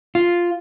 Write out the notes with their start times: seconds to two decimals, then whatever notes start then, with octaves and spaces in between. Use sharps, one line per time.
0.15 F4